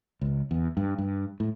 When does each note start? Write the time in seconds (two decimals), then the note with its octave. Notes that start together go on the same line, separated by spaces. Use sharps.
0.21 C#2
0.51 E2
0.77 G2
0.98 G2
1.40 A2